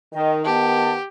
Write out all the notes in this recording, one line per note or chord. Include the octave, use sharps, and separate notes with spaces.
D#3 D#5
D#3 B3 G4 A5